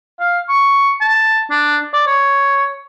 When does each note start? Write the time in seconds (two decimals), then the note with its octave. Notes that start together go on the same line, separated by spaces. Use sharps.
0.20 F5
0.49 C#6
1.01 A5
1.50 D4
1.93 D5
2.07 C#5